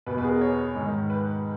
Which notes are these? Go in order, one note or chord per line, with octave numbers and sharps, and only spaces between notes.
E2 B2 B4
B4
G#4
A#4
C#5
G#2 D#3
B4